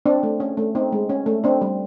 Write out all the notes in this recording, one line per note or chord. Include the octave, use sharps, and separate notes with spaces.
C4 D4
A3
C#4
A3
C4 D#4
G#3
C#4
A3
C4 D4
G3